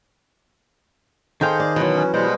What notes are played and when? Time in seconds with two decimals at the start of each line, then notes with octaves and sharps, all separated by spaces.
1.41 D#3 G#4 A4 C5 D#5 F5 G5 C6
1.60 D5
1.76 B2 E3 F#3
1.94 C#4
2.14 B2 G3 G#3 C5